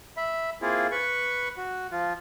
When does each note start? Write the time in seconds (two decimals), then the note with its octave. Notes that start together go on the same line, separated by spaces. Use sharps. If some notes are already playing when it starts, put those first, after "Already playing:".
0.17 E5 B5
0.62 A#3 C4 E4 F4 G#4
0.92 B4 B5 C#6
1.57 F#4
1.91 F3 F4